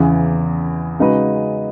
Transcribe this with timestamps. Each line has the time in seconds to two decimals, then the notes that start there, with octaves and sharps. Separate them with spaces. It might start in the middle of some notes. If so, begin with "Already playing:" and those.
Already playing: E2 C#3 E3
1.00 C#3 G#3 D#4 F#4 B4